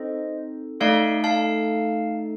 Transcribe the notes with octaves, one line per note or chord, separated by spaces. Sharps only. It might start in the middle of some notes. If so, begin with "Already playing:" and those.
Already playing: C4 D#4 A4 C5 D#5
A3 D#4 A4 D5 F5
F5 A5